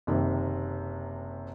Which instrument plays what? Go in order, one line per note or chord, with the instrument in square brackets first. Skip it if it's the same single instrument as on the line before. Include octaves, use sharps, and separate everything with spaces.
[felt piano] F#1 C3 D#3